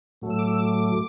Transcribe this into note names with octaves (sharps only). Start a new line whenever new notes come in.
A2 F#3 A3
E6
D6
E6
D6